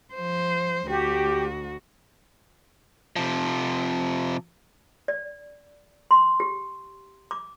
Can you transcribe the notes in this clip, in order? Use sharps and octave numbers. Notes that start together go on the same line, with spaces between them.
F3 C5
D2 F#4 G4
C3 F3
D5
C6
G4
D6